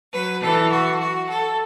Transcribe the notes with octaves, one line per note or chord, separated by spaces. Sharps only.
F#3 B4
E3 A4
F#4
F#4
A4